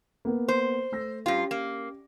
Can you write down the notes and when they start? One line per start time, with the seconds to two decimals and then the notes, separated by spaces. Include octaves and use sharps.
0.25 A#3 B3
0.48 C5
0.92 A3 E6 A#6
1.26 G2 C#4 F4 G4
1.51 A#3